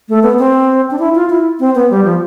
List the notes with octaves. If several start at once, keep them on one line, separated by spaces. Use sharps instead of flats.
A3
B3
C4
D4
E4
F4
E4
C4
B3
G3
F3